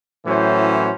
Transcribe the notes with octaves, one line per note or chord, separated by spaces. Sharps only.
A2 E3 F#3 C#4 C5